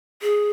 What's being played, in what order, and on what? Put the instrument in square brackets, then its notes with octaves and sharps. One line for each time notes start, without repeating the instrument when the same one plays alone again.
[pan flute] G#4